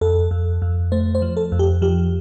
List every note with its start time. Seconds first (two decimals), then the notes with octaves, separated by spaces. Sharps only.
0.01 F2 A4
0.31 F2
0.62 F2
0.92 A3 C5
1.15 C5
1.22 F3
1.37 A4
1.52 F2
1.59 G4
1.82 F3 G4